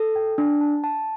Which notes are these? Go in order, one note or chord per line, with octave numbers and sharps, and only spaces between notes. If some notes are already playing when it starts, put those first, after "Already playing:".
Already playing: A4
G5
D4
A5
A5